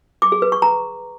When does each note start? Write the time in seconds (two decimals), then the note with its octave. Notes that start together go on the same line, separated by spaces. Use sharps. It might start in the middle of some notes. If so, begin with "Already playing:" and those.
0.22 D6
0.32 G#4
0.42 B4
0.52 C#6
0.62 A#5